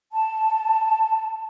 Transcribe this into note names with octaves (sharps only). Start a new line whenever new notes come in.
A5